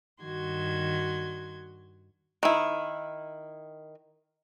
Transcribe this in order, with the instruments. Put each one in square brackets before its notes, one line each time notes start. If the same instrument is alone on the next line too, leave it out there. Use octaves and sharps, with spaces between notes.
[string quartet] G2 D#3 F#4 C6 G#6
[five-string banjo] D#3 E4